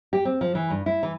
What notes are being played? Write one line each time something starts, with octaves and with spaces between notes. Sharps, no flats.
G4
C4
F3
E3
G2
E4
E3